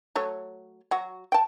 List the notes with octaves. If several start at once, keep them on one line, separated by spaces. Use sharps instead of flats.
F#3 A3 C#5
F#3 F#4
G5 A5